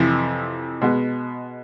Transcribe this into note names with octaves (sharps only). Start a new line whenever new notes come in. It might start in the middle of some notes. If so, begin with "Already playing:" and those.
Already playing: F2 C3 E3
B2 G#3 B3